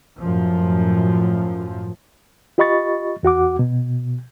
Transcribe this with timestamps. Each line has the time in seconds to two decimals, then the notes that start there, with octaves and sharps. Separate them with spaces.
0.19 F#2 A2 F3
2.58 F4 G4 D#5 B5 C#6 A6
3.23 E2 F#4 F#5 D6
3.59 B2